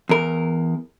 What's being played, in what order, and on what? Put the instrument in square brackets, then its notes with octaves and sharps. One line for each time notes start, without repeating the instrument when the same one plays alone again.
[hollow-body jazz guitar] E2 A#4